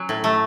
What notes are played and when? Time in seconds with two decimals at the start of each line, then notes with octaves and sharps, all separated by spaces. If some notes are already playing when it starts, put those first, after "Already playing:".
Already playing: F#3 C#4
0.09 A2
0.24 A3